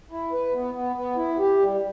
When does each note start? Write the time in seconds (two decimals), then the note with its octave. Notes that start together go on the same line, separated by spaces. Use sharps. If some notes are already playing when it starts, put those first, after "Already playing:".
0.11 E4
0.32 B4
0.54 B3
0.74 B3
0.96 B3
1.17 E4
1.39 G4
1.60 G3